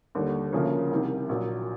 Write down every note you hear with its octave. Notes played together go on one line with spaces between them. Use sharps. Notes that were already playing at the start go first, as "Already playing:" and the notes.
D#2 D3 G3
D2 C#3 F3 A#3
C2 C3 D#3
A#1 A#2 F#3